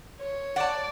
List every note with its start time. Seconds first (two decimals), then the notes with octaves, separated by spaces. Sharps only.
0.19 C#5
0.56 D5 F#5 A5